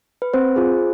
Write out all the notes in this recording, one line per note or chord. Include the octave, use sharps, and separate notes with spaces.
B4
C4 C5
F4 G#4